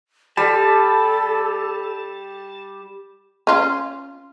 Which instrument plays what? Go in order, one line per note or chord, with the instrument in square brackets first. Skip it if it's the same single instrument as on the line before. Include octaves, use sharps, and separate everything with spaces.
[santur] G3 [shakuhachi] A4 [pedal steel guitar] A5
[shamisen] C#4 F4